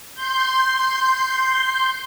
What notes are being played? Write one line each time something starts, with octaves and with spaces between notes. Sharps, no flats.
C6 G6